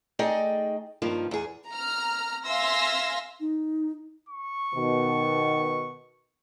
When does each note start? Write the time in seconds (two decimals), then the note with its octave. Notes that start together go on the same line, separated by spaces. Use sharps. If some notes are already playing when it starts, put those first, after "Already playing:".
0.19 A3 D#4 G#4 D5 D#5 G5
1.02 G2 D#3 F3 A#3
1.31 E2 G#4
1.69 A#5 F6
2.45 E5 F5 G#5 C6 E6 A#6
3.40 D#4
4.29 C#6
4.75 B2 D#3